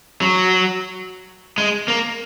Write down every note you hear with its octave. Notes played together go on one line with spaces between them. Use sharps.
F#3
G#3
A#3